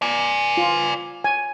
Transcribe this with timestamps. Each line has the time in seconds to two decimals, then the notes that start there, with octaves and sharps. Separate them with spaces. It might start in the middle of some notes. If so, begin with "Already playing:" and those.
0.02 D5 G#5
0.57 F4
1.24 G#5